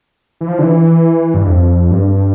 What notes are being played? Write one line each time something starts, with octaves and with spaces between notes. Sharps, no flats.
E3
F3
D3
E3
G2
F2
G2